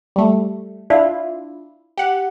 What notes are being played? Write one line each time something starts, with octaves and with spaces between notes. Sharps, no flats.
G3 A3
D4 E4 F4
G4 F#5